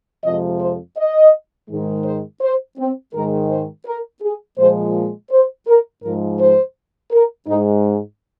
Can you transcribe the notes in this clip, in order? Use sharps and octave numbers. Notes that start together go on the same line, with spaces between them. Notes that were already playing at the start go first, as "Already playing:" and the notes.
F2 C3 F3 G#3 D#5
C5
D#5
G#2 D#3 G#3
C5
C5
C4
G#2 D#3 G#3 A#4
C5
A#4
G#4
A#2 F3 G#3 C5
C5
A#4
G#2 F3 G#3 A#4
C5
A#4
G#2 G#3 D#4